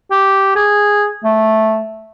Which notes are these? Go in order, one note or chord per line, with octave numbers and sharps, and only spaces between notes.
G4
G#4
A3